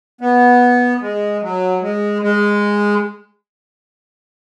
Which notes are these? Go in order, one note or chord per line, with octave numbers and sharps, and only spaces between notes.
B3
G#3
F#3
G#3
G#3